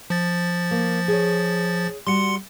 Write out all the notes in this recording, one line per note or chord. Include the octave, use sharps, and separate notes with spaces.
F3 A6
A#3
G#4 C#5
G3 F#4 C6 C#7